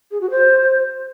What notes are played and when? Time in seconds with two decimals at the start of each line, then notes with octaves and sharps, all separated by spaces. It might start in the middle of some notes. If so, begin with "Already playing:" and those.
0.11 G#4
0.21 F#4
0.31 C5